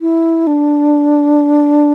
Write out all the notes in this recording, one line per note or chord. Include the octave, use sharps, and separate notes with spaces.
E4
D4